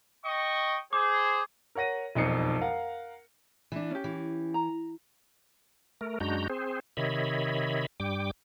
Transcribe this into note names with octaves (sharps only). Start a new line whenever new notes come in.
D#5 G5 C#6
G#4 C5 D6
A#4 C#5 F#5 A#6 D#7
E1 B1 F2 D#4 C7 C#7
A#4 F5 F#5
E3 D4
C#4 G4
E3
A#5
A3 A#4
F#2 G#3 D4 F#4 A#5 G6
C4 G#4 C5
C3 D#3 C#5 D#5 E5 B5
G2 G3 G5 D6